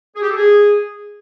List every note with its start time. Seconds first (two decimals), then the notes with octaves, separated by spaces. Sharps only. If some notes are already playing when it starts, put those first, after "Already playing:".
0.15 G#4
0.22 G4
0.29 A4
0.36 G#4